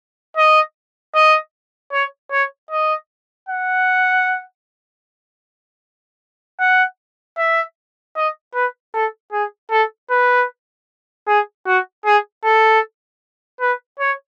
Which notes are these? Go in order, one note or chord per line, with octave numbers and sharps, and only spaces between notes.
D#5
D#5
C#5
C#5
D#5
F#5
F#5
E5
D#5
B4
A4
G#4
A4
B4
G#4
F#4
G#4
A4
B4
C#5